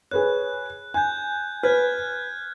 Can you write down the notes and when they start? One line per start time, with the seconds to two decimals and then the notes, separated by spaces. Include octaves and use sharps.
0.11 G#4 B4 C#5 F#6
0.94 G#5 F#6 G6
1.63 B4 F6 F#6 G#6